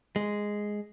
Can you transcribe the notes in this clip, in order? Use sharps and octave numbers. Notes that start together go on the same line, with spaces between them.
G#3